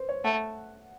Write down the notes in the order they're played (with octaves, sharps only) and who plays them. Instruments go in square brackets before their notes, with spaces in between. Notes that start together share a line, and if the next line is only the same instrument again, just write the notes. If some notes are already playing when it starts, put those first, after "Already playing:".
Already playing: [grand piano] B4 C5
C#5
[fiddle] A3 [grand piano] F#5